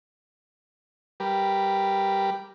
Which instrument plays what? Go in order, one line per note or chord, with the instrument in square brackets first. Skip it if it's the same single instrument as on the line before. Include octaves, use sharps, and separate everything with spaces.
[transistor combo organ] G3 G4 A#4 B4